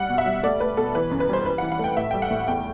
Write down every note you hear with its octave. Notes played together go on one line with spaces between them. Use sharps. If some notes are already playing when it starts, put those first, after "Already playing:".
Already playing: G3 F#5
B2
E5
G3
A3 D5
A3 B4
B2 A4
E3 B4
F#2
B4
G3 C5
E3 B4
E3 F#5
F#5
A3 G5
A2 E5
G3 G5
F#5
A2
E2 G5